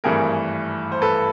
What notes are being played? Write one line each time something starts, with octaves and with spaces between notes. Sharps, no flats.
G#1 G2 E3 A3 G#4 A#4
C5
A4 B4